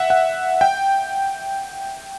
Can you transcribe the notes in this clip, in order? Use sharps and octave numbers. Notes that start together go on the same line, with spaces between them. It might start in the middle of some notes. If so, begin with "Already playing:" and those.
Already playing: E5 F#5
F#5
G5